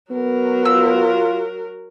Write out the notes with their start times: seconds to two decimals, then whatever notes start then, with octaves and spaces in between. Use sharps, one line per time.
0.12 F#3 B3 A#4
0.65 F4 E6